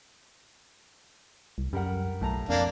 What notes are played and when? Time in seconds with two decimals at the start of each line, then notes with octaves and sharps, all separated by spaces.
1.58 C2
1.73 F#2 G3 A#4 F#5
2.22 B1 A2 A5 A#5
2.49 F2 A#3 D4